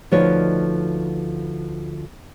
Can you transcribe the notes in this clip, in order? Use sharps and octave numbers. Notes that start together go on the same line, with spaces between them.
D2 F3 D#4 B4 C#5 D#5